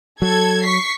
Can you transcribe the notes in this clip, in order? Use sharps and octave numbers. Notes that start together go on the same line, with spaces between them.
F#3 A4 G#6
C#6 B6 C7